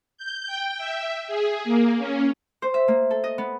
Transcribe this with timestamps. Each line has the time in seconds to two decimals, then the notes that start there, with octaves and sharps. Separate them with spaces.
0.18 G6
0.47 G5
0.78 E5
1.28 G#4
1.64 A#3
1.98 C#4
2.62 C5
2.74 E5
2.88 A#3
3.10 A4
3.24 D#5
3.38 B3